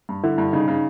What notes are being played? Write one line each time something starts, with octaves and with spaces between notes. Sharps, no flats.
G2
D3 E4
G2
C#3 D#4
C#3